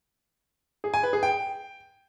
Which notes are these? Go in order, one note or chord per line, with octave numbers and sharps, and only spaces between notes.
G#4
G#5
B4
G#4
G5